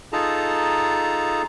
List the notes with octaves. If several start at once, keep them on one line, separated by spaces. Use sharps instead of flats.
D#4 F4 G#4 A4 A5 A#5